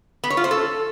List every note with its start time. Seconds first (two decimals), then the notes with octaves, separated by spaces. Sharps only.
0.24 B3
0.30 C#5
0.37 F4
0.44 C5
0.51 A4